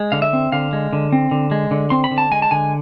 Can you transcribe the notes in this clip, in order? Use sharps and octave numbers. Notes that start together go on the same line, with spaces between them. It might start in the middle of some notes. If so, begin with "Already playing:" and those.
Already playing: G#3
D3 F5
E5
C4
D3 F5
G#3
D3
C4
D3
G#3
D3
C4 C6
B5
D3
A5
G#3 G#5
A5
D3 G#5